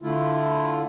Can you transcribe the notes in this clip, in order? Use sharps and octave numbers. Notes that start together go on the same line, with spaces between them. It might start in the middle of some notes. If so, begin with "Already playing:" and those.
D3 A3 E4 F4